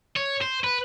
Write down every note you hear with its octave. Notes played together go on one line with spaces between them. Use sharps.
C#5
C5
B4